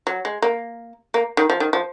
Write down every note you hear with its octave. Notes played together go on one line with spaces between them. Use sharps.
F#3
G#3
A#3
A#3
D#3
F3
D#3
F3